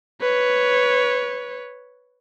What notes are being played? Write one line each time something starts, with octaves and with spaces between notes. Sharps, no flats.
B4 C#5